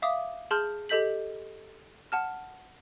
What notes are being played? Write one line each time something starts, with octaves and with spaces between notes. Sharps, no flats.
E5 F5 D6 D#6
G#4 A5 C6 F6 G6
G4 A4 D#5 G6 B6 F#7
F#5 A5 F6